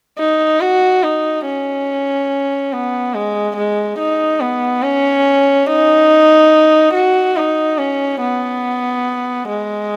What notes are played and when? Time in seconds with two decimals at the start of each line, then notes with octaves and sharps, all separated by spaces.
0.19 D#4
0.61 F#4
1.03 D#4
1.46 C#4
2.72 B3
3.14 G#3
3.57 G#3
3.99 D#4
4.40 B3
4.83 C#4
5.67 D#4
6.94 F#4
7.36 D#4
7.78 C#4
8.21 B3
9.48 G#3